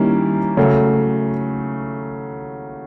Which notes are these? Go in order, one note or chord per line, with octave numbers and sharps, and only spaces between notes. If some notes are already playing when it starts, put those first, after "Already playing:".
Already playing: D#3 G3 A#3 C#4 E4
C#3 F#3 A3